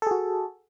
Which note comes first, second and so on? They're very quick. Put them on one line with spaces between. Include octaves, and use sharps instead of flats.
A4 G#4 F#4